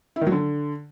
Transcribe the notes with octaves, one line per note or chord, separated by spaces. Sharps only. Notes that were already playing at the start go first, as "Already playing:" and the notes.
E4
D#3
F#3
D3